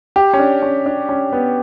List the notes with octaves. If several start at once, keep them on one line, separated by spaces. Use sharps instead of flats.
G4
C#4
D4
C#4
D4
C#4
B3